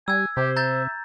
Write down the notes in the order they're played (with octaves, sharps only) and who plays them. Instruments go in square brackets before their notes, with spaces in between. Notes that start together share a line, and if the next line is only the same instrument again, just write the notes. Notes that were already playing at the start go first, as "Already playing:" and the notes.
[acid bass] G3 [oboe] G#5 [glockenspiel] E6 G#6
[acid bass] C3 [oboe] G4 [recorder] C5
[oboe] E5 [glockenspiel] A#5 G6 A6